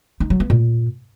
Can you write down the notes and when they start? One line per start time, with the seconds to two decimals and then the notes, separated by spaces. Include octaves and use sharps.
0.20 D#4
0.30 F#3
0.40 B3
0.50 A#2